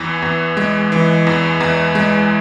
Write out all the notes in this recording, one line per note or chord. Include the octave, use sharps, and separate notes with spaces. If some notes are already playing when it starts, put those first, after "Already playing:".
Already playing: E2 E3
E2
G#3
E3
E2
E2
G#3